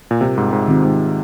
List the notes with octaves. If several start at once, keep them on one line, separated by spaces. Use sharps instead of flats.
A#2
C3 G3 C4 F4 A#4
G#2
G#2
D#3 G#3 C4 F4
G#2